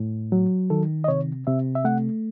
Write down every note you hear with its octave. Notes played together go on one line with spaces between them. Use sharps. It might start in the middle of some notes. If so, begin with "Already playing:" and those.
Already playing: A2
F#3
D#3 A4
D#5
C3 C#5
C3 E5
E5
A3 F#5